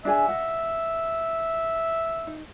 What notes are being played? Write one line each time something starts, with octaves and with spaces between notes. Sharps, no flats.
D4 G#4 E5 G#5
D#5 F#5
D#4